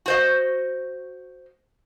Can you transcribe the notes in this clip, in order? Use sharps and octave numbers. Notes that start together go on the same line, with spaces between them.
F#4 C5 D#5